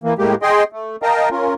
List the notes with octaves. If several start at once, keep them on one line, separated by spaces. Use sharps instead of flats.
E3 A#3
A2 G#3 A#3 G4
G#4 D#5 G5 C6
A3
A#4 D#5 F5 G5 A5 A#5
C#4 F4 A#4